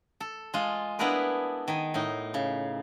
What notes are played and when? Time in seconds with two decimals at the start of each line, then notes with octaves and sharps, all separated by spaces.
0.20 A4
0.54 G#3 F4
0.99 B3 D4 E4 G#4 A#4 B4
1.68 D#3 G#5
1.94 A2 D#4
2.34 C#3